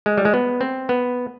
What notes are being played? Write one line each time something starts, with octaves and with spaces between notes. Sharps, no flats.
G#3
G3
G#3
B3
C4
B3